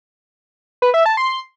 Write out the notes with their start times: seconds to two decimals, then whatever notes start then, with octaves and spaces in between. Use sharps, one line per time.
0.82 B4
0.94 E5
1.06 A5
1.17 C6